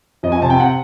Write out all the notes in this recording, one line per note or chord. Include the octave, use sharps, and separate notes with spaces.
F2 D#5
G#5
C3 A5
G5
F#5